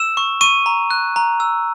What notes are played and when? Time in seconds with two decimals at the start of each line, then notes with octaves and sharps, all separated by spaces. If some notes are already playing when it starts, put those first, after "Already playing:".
Already playing: E6 E7
0.17 C#6
0.41 C#6 D#7
0.66 A#5
0.91 F#6
1.16 A#5
1.40 E6